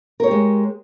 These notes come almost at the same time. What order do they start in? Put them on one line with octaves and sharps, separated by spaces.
A#4 C#5 G4 G#3